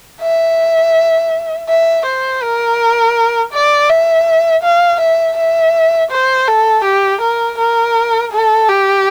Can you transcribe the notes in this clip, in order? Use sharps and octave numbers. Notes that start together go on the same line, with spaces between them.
E5
E5
C5
A#4
D5
E5
F5
E5
E5
C5
A4
G4
A#4
A#4
A4
G4